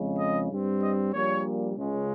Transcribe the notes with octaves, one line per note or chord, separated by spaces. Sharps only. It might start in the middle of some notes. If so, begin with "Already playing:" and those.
Already playing: F2 C#3 G#3
D#5
G2 G3 C4
D#5
A#1 A#2 G3 A#3 C#5
C#2 C#3 G#3